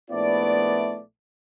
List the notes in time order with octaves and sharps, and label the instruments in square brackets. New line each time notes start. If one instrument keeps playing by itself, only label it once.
[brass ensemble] A#1 A3 B3 E4 D5